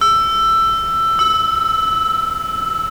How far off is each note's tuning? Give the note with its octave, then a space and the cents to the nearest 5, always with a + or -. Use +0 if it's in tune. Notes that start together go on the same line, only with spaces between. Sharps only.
E6 +15
E6 -15